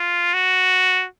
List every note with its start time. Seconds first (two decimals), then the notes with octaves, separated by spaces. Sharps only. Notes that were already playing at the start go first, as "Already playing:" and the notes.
Already playing: F4
0.34 F#4